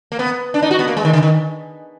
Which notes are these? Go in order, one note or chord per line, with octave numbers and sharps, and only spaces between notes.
A#3
B3
D4
D#4
F#4
B3
A#3
G#3
D#3
D3
D#3